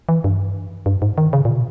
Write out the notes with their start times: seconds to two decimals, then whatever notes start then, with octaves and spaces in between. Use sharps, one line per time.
0.09 E3
0.24 G2
0.86 G2
1.02 G#2
1.18 D#3
1.33 C#3
1.45 A#2
1.56 B2